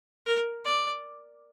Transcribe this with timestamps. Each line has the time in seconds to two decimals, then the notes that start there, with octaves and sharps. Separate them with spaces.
0.26 A#4
0.65 D5